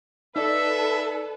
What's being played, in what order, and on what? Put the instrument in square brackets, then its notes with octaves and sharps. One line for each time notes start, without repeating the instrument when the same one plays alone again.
[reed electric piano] D#4 D5 [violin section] A4 B4 [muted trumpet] E5